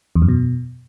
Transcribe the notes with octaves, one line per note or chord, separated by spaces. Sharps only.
E2
F#2
B2